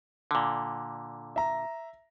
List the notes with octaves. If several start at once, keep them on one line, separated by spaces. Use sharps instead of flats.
A#2 D3
E5 A#5